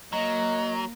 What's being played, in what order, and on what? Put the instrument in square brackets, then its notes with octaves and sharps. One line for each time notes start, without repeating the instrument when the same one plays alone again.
[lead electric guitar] F#3 [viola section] A#3 [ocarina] D#5 [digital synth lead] A#5